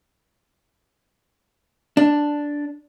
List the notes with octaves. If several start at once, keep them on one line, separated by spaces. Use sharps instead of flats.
D4